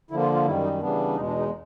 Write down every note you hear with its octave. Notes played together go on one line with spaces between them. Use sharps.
D3 F3 A#3 E4
F4
F4
F#2 D#3 G3 E4
D#4
C#3 E3 G3 B3 D4
E2 B2 G#3 D#4
D4
D#4